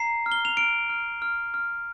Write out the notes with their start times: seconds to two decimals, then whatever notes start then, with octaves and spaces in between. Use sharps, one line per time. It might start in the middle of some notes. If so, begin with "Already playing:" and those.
Already playing: A#5 C7
0.26 F6
0.32 G7
0.45 F7
0.57 F6 D7
0.90 F6
1.22 F6
1.54 F6